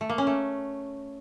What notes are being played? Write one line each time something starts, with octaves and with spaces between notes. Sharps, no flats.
A3
A#3
C#4
A3